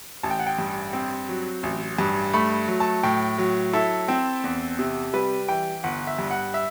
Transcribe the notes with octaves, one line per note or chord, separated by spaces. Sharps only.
A1 A5
G5
F#5
G5
G2
C4
F#3
A1
G2
A3 B5
F#3
A5
A2 G5
F#3
E4 A4
C4
E2
C3
G3 B4
E3 G5
G1 F#5
E5
G2
F#5
E5